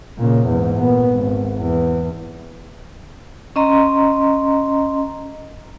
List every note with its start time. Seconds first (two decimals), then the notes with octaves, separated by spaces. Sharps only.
0.18 A#2 C#3
0.47 E2 G#2
0.78 A#2 B3
1.10 G#1
1.59 E2
3.56 C#4 D#5 A#5 C6